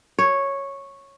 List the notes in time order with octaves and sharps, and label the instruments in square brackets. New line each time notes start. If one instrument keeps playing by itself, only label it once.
[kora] C#5